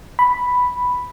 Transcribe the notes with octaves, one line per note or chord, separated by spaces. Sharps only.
B5